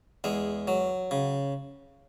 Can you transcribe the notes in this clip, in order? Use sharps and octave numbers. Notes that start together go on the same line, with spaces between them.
E2 G#3
F#3
C#3